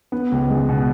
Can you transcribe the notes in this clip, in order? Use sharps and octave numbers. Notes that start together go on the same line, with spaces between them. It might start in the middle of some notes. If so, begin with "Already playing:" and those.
B3
C#2
G#3
B2